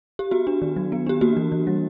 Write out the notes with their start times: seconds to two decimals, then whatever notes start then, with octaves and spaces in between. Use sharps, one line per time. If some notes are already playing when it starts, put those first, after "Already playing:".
0.19 G4
0.31 B3 F#4
0.47 D4
0.62 D#3
0.76 F#3
0.92 B3
1.06 D4 G4
1.21 A#3 F#4
1.37 E3
1.52 E3
1.67 G3